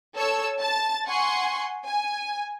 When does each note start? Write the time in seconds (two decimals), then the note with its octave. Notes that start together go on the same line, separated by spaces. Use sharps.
0.15 A4 C#5 E6
0.60 A5 A6
1.07 F#5 G#5 C6 C#6
1.86 G#5